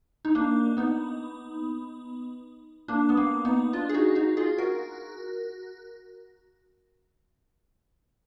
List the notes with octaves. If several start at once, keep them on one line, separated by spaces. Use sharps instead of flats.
D#4
A#3 D4
B3 D#4
A#3 D4
B3
A#3
B3 D#4
D4 F4
G#4
D#4 F#4
D#4 F#4
F4 G#4
F#4 A#4